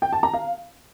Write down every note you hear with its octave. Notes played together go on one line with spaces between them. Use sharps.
G5
A5
A#5
F5